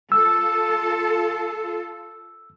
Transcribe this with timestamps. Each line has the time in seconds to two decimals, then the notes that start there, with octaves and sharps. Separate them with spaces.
0.12 F4 A4 E6